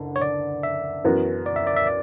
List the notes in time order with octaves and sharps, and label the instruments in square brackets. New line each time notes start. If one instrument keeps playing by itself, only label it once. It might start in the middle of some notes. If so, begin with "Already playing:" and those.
Already playing: [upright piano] F#1 D3
[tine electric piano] C#5
D5
E5
[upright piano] F#2 E3 B3 F#4
[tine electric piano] D5
E5
D5
E5
D5